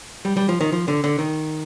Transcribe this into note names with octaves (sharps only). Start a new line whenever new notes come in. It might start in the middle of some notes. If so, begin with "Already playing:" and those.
G3
G3
F3
D#3
F3
D3
D3
D#3